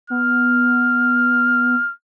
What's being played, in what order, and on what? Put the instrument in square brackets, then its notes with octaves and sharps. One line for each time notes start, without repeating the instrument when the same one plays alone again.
[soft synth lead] B3 [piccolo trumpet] F6